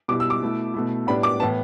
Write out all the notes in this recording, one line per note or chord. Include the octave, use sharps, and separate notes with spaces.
B2 G3 E4 D6
E6
D6
B2 A3 E4
B2 A3 E4
A2 G3 B3 D4 B5
D6
A2 E3 B3 A5